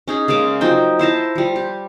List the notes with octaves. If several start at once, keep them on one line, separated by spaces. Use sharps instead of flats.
C#4 D#4 G#4
C#3 G#3 A#3 D6
F3 F#3 D#4 G5
E4 C5 A5 A#5
F3 G3
G4